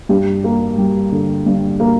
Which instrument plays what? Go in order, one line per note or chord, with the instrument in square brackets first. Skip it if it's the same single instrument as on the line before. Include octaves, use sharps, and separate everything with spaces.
[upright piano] G2 G4
A#3
G3
D3
G2
A#3